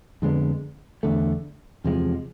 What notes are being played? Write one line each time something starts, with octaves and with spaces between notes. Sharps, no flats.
F2 D3 G#3 B3
E2 D3 A3
E2 C3 F3 G#3